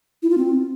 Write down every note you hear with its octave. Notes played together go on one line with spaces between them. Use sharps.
E4
F4
C4